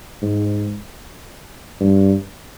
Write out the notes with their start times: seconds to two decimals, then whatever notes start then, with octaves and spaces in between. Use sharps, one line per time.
0.22 G#2
1.80 G2